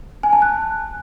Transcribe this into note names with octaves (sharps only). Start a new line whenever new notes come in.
G#5
A5
F#6